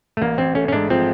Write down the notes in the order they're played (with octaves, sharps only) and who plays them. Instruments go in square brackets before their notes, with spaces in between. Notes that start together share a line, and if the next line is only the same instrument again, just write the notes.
[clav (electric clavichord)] A3
[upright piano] A1 [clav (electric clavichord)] A#3
[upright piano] A1 [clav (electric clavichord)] C4
[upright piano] A3 [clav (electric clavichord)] C#4
[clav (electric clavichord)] C#4
[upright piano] G#2 [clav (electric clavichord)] D4
[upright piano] F3 [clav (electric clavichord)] C4